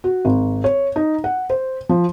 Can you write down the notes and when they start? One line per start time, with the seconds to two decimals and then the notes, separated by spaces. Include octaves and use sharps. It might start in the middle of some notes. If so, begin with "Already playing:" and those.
0.04 F#4
0.25 G#1
0.64 C#5
0.96 D#4
1.24 F#5
1.50 C5
1.89 F3